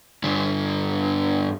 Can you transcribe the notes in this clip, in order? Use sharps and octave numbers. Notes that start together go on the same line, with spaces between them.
G2 D3